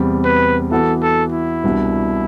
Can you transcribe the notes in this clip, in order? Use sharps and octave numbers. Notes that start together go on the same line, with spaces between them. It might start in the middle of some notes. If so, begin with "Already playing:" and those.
Already playing: E2 C3 G3
B4
E3 B3 F#4 A4
A4
E4
C2 B2 G3 D4 F#4